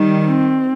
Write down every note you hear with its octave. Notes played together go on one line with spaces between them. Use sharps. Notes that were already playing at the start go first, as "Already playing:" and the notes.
Already playing: D#3 G3
C4